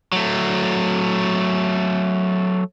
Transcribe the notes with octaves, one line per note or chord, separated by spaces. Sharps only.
F#3 A3